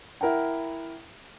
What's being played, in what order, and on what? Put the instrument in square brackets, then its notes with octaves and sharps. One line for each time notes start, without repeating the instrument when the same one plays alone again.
[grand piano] E4 A#4 F#5 G5